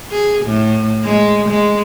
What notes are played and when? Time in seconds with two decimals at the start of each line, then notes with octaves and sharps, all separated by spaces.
0.11 G#4
0.46 A2
1.05 G#3
1.50 G#3